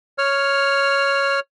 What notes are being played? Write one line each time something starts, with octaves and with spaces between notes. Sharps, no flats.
C#5 F6